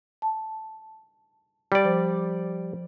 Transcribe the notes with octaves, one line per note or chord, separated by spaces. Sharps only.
A5
G3 D5
F3 C5